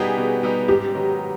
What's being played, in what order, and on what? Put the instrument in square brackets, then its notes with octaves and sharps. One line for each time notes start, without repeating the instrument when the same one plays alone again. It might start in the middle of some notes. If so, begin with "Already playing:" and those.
Already playing: [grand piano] B2 G3 B3 D#4 G4 [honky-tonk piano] G#4
[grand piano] B2
G3 B3 D#4 G4
[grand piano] G#2 [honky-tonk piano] G4
[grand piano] D#3 F#3 B3 D#4